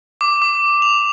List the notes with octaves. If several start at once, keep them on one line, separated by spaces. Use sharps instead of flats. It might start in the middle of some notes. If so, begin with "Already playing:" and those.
D6
D6
F7